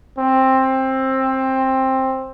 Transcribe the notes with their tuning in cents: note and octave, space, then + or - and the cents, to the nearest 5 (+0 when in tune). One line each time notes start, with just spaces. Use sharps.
C4 +15